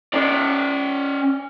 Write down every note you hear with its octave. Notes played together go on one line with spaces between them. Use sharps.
C#4 D5